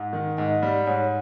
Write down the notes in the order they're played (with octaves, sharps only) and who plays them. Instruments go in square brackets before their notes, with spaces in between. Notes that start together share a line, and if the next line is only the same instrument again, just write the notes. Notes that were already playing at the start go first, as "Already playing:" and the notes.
Already playing: [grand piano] G#2
D#3
[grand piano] G#2 [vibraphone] D#5
[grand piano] G3 [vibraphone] D5
[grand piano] G#2 [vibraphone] C#5